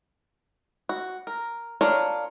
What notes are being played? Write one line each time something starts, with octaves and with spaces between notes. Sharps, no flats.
F#4
A#4
D4 F4 A#4 C#5